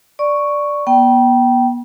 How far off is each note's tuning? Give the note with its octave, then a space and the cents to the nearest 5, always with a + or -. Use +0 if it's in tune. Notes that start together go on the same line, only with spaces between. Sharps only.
D5 +0 C#6 +0
B3 -35 G5 -20